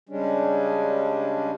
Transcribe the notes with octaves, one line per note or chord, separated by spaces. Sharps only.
C#3 G3 G#3 C#4 D4